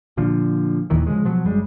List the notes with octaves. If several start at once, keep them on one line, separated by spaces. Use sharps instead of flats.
A#2 D3 F3
D#2 A#2 D#3 E3
C#3 F3 G#3
B2 F3 F#3
G1 F#2 G3 G#3